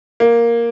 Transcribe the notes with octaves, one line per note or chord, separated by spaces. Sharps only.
A#3